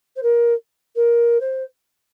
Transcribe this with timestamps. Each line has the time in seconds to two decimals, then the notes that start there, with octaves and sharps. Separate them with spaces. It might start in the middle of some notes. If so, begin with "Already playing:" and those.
0.16 C5
0.22 A#4
0.95 A#4
1.40 C5